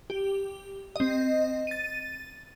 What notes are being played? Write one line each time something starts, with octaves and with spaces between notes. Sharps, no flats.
G4
C4 D#5
A6 D#7